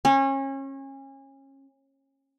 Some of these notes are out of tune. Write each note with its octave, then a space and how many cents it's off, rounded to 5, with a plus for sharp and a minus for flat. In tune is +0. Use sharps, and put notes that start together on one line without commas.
C#4 -30